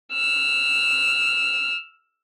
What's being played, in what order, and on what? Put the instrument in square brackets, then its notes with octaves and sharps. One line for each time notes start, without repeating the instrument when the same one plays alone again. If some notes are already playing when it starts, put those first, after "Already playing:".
[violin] E6 F6